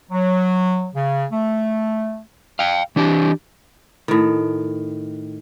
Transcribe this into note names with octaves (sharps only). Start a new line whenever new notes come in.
F#3
C#3
A3
F5 G5
E3 D4 G4
A2 D#3